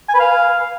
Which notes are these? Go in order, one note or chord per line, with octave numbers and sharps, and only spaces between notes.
G#5
B4
F5